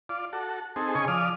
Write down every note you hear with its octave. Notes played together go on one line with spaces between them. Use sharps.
F4 D5
F#4 A4
C4 D#4 G#4 A4
C#3 G#4 D#5 G#5 C#6
F3 D5 D#6 F6